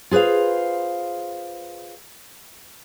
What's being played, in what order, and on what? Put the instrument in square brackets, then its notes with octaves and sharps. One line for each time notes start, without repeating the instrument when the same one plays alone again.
[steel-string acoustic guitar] F4 G#4 B4 C5 F5